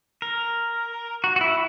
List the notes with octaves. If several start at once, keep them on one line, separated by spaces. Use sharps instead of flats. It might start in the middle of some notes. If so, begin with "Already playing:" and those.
A#4
F#4
F#4
E4